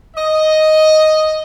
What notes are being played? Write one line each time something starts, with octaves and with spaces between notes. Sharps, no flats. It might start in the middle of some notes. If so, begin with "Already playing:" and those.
D#5